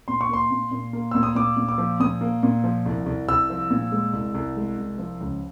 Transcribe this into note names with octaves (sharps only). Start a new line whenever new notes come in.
A#2 C6
C#6
A#3 C6
A#2
A#2
A#3
A#2 E6
D#6
A#2 D6
A#2
D6
F3
A#2 D#6
A#3
A#2
F3
C2
C2
C2 E6
F3
A#2
G#3
C2
C2
G#3
C2
F3
C#2